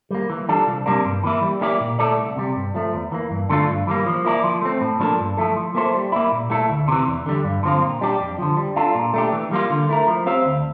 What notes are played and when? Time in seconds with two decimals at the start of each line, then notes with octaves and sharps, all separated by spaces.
0.11 G3 A#3
0.30 E3
0.49 G3 D4 F4 A4
0.67 C2
0.86 C3 G3 A#3 D4
1.05 G2
1.23 E3 A#3 E4
1.42 G3
1.61 A#3 E4 G4 D5
1.80 A#2
1.99 A3 E4 A4 D5
2.17 C2
2.36 C3 G3
2.56 G2
2.74 F3 A3
2.93 E2
3.12 E3 A#3
3.31 G2
3.50 D3 A3 D4 F4
3.68 G2
3.87 E3 G3 A#3
4.06 F3
4.25 A#3 E4 A4 D5
4.44 F3
4.62 A3 C4
4.81 A2
5.00 F3 A#3 D4 A4
5.19 G2
5.37 F3 A3 E4 A4
5.56 F3
5.75 A#3 E4 A4 C5
5.95 G3
6.12 A#3 E4
6.32 A#2
6.50 A3 E4 A4
6.70 D2
6.88 C3 E3
7.07 E2
7.26 D3 G3
7.44 G2
7.63 D3 F3 C4 F4
7.82 A#2
8.01 G3 D4 G4
8.20 F2
8.38 D3 F3
8.57 G3
8.76 D4 F4 A4
8.95 A#2
9.14 A3 D4 G4
9.32 E3
9.51 G3 A#3 F4
9.70 D3
9.89 A3 E4 A#4
10.08 F3
10.26 C4 G4 C5 F5
10.46 D2